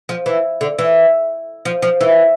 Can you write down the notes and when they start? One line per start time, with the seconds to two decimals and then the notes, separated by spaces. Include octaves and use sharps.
0.09 F3
0.26 E3
0.61 D3
0.78 E3
1.65 F3
1.82 F3
2.01 E3